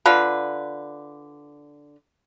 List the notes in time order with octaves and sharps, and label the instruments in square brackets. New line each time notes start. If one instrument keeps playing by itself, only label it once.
[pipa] D3 F4 B4